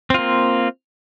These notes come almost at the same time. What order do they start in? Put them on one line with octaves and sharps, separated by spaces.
C4 F4 A#3